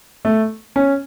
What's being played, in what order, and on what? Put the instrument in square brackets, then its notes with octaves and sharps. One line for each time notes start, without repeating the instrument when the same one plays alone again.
[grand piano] A3
C#4